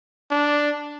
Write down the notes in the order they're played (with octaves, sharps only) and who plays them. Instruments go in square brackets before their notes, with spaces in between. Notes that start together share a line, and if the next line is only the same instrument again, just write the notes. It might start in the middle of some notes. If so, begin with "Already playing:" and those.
[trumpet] D4